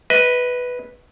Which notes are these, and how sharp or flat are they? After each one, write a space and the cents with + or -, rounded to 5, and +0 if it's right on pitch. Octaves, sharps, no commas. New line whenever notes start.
B4 +0 D#5 +30